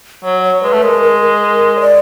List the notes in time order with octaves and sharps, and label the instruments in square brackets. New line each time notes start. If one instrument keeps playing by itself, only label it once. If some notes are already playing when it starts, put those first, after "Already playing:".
[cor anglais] F#3 [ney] C#5
[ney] C#5
[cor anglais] G#3 [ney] B4
[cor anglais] A3
[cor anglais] G#3 [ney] A#4
[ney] A#4
C#5
D5